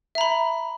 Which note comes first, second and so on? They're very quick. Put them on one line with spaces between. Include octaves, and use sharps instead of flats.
E5 A#5 B5